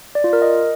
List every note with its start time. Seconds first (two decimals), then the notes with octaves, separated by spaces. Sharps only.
0.15 D5
0.24 F4
0.33 A#4
0.42 D#5